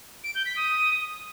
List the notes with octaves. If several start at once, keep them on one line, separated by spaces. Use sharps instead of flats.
D7
G6
B6
D#6